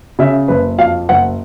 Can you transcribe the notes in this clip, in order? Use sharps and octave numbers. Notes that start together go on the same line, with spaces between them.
C#3 E5
F#1 B4
F2 F5
F#1 F#5